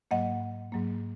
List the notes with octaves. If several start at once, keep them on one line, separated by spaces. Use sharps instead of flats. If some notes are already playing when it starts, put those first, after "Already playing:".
G#2 F#3 A#3 D#5 F#5
G#2 F#3 A#3